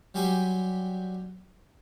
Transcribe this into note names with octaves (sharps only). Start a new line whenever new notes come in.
F#3 G3 G4 G#5 B5 C6